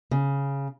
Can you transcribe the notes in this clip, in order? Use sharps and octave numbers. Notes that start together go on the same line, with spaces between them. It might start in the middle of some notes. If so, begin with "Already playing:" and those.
C#3